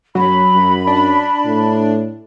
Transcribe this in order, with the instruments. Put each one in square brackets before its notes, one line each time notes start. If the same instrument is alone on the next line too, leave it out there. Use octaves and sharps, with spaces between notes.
[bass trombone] F#2 [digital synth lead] F#3 [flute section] B5
[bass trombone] F#2
[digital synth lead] D4
[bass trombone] A2